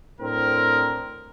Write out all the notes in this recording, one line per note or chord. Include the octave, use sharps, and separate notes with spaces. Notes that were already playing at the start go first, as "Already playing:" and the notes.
A2 C4 D4 A#4